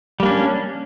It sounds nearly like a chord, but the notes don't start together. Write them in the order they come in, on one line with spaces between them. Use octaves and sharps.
G3 A#3 D4 C#4